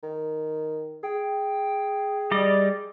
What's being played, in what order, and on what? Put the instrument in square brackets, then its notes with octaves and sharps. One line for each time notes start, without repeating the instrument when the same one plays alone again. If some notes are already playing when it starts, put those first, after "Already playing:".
[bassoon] D#3
[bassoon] G#4 [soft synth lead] G5
[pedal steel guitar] G3 D5 D#5